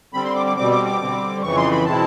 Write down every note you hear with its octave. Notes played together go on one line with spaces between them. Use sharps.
D3 G3 C4 B5
C6
D6
D6
B2 G3 C4 D6
D6
D6
D3 G3 C4
F2 C#3 E3 C#6
C6
B5
B2 G#3 C4 E4 A5